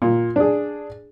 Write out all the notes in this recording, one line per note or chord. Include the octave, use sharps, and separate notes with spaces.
A#2
D4 G#4